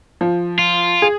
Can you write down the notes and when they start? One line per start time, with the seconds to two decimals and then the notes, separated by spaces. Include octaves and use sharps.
0.21 F3
0.59 F4
1.02 G#4